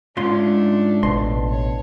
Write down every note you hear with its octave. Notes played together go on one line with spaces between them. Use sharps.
G#2 A3 C#4 D4 F4 C6
A1 B2 A5 C6
C#5